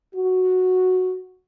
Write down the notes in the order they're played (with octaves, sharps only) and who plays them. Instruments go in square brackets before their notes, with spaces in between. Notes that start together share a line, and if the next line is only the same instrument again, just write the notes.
[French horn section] F#4